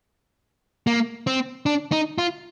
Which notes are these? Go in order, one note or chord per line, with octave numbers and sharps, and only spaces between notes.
A#3
C4
D4
D#4
F4